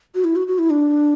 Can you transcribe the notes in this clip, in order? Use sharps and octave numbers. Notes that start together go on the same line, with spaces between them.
F#4
E4
F#4
F#4
E4
D4